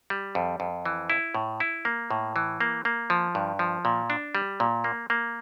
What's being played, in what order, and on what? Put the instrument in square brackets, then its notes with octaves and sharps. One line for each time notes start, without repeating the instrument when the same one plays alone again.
[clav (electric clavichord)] G3
F2
F2
E3
E4
A2
E4
A#3
A2
E3
A#3
A#3
F3
G2
F3
A#2
D4
G3
A#2
A#3
A#3